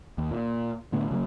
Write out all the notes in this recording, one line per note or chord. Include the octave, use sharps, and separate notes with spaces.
D#2
A#2
A2 D3 A3 B3
C#3 F#3 A3 A#3